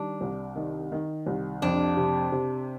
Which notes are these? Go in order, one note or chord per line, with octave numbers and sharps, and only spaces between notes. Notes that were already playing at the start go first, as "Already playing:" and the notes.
Already playing: D#3 G3 D4
C2
D#3
D#3
C2
F2 D4
C3
C3